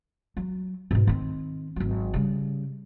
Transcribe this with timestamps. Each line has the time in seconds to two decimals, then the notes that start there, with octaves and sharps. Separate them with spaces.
0.37 F#3
0.91 G#2 B2
1.07 D#3 C4
1.76 G#1 F#3
2.14 C#3 G3